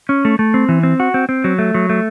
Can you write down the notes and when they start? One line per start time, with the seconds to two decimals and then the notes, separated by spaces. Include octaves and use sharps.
0.09 C#4
0.25 A3
0.39 A3
0.54 C4
0.69 E3
0.83 C4
1.00 F#4
1.14 C4
1.29 C4
1.44 F#3
1.59 A3
1.74 F#3
1.89 A3